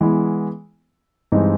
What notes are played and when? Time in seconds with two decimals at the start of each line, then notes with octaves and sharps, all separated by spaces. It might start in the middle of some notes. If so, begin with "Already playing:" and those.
0.01 E3 G#3 B3 E4
1.32 G2 E3 G#3 C4 D#4